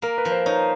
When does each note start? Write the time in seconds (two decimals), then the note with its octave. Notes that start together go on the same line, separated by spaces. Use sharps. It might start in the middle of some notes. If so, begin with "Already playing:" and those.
0.02 A#3 A#4
0.18 B4
0.25 F3
0.32 C5
0.46 D#4 C#5